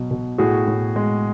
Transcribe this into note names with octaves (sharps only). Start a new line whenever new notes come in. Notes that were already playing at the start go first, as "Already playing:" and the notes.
Already playing: B2 F#3
B2
A2 F#4 G#4
A2
G#3